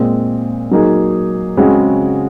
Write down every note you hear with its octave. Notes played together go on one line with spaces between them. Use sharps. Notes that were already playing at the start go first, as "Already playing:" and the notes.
Already playing: A#2 G#3 C4
F#3 A#3 D#4 G#4
C#3 G#3 C4 F#4